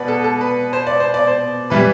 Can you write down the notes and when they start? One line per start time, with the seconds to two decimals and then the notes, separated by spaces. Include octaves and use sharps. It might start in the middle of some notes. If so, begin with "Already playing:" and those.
Already playing: B2 B4 D5 F#5
0.08 A4
0.24 A4
0.41 B4
0.73 C5
0.87 D5
1.00 C5
1.14 D5
1.27 C5
1.70 E3 G3 B4